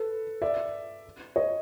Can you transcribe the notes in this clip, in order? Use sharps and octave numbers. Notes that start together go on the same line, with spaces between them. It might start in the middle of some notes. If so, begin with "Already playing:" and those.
Already playing: A4 B4
D5 E5
C#5 D#5